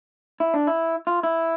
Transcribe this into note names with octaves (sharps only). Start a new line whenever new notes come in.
E4
D4
E4
F4
E4